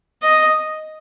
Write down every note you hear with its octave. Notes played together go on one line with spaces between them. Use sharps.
D#5